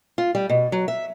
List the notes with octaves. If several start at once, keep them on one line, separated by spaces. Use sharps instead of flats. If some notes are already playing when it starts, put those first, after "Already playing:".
F4
G3
B2
F#3
E5